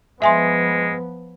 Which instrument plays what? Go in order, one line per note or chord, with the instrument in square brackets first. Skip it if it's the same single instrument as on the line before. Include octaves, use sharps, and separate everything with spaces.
[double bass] F3 B3 [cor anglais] G#3 [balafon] E5 G#5 C6